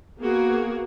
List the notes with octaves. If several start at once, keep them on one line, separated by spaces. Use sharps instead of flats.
A#3 B3 F#4 G#4 A#4